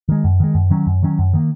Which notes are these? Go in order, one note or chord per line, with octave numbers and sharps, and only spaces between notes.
D#3 G#3
F#2
D#3 G#3
F#2
D#3 F#3 C#4
F#2
D#3 F#3 C#4
F#2
D#3 A#3